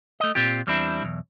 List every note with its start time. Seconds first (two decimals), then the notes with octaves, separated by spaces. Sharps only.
0.20 A3 D#5
0.35 A#2 C4 F4 G4
0.67 E2 G3 C4 D4 E4
1.03 B1 E2